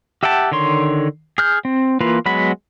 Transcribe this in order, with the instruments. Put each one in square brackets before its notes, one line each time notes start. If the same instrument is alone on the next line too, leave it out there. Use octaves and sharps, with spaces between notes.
[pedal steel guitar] G4 E5 F#5 G5 A5
D3 D#3 C#5 C6
G#4 F6 G6
C4
E3 A#3 F4 B4
F#3 G#3 B3 B5